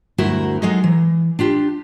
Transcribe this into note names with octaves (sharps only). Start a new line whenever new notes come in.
D2 G2 E4 F#4 A#4 C5
F#3 G#3 D#4 G#4 A4 D#5
E3
D4 F4 G4